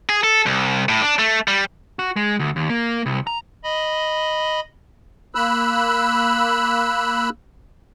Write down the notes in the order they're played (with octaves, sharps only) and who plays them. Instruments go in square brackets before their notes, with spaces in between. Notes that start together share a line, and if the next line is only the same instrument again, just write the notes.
[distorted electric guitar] G#4
A4
C2
A2
D4
A3
G3
[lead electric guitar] F#4
G#3
D2
D#2
A#3
C2
A#5
[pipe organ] D#5 B5
[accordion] A#3 B5 E6 F#6